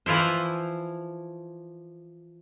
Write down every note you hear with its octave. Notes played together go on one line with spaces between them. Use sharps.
E3 F3 E4 C5